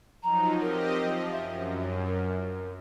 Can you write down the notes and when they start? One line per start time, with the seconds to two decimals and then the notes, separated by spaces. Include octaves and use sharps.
0.23 F3 F#3 D#4 A#5
0.60 C4 G4 A#4 D#5
1.00 F3
1.31 F#2 E5
2.05 A#4